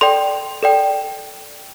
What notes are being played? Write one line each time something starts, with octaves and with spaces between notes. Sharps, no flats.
A4 D5 G5 C6
A4 D5 G5